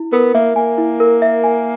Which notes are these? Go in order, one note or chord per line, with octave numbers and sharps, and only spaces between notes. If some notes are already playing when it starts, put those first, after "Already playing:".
Already playing: E4
B3 A#4
A#3 E5
A#3 G#5
E4
A#4
E5
G#5